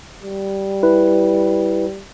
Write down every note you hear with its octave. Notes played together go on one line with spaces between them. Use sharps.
G3
E4 B4